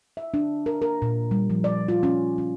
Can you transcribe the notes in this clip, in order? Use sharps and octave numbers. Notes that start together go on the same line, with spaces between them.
E5
D4
A#4
A#4
A#2
G3
F3
D5
F4
C#4
C#4